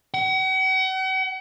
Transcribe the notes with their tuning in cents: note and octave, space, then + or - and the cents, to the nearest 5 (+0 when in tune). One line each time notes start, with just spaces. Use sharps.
F#5 +40